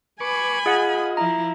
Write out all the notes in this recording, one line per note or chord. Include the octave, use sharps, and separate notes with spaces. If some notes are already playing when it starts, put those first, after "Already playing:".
B4 G#5 B5 C#6 D6
F4 G#4 D#5 F#5
F3 E4 A#5